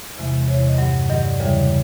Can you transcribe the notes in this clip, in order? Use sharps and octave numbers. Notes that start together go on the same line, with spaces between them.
E2 C3 E3 G#3
E2 C3 E3 G#3 C#5
D#5
G2 D#3 F#3
G2 D#3 F#3 D#5
D5
E2 C#3 E3 G3